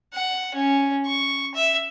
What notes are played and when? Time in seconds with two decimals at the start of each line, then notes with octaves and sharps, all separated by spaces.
0.14 F#5
0.54 C#4
1.06 C#6
1.54 E5